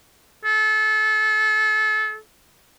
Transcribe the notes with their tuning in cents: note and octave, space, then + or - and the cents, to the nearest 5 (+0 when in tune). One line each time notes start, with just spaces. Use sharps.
A4 -30